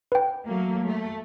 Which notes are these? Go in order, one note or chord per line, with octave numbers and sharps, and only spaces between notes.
B4 G5
F#3 A3 A#3
A3